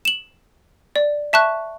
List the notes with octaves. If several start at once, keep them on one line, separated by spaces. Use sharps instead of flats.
E7 F#7
D5
E5 A5 C#6 F#6